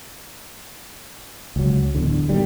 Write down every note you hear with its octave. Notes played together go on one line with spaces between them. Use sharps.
C#2 F#3
D1 E2 D3
B2 D#3 G3